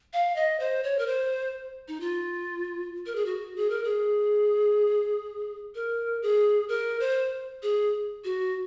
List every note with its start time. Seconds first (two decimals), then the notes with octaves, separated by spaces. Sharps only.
0.13 F5
0.36 D#5
0.60 C5
0.84 C#5
0.99 A#4
1.07 C5
1.88 D#4
2.00 F4
3.06 A#4
3.15 G#4
3.26 F#4
3.56 G#4
3.70 A#4
3.84 G#4
5.75 A#4
6.22 G#4
6.69 A#4
7.00 C5
7.63 G#4
8.24 F#4